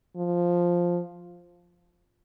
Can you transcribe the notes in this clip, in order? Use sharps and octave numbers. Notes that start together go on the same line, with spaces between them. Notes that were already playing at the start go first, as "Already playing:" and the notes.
F3